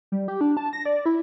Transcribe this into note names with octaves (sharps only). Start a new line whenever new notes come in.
G3
G4
D4
A5
A#6
D5
E4